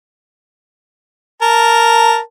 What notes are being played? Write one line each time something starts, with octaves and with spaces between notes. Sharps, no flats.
A#4 A5